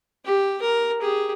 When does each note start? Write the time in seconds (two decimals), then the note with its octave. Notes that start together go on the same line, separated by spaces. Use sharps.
0.25 G4
0.62 A#4
1.01 G4 G#4